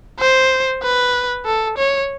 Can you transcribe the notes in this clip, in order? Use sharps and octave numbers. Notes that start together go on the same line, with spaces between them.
C5
B4
A4
C#5